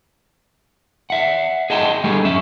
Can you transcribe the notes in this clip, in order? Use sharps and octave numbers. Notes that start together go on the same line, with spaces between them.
E5 F#5
G#4 D#5 F#5 G5 A5 A#5
G3 A3 B3 D4 G4 G#4
F#2 C#4 E5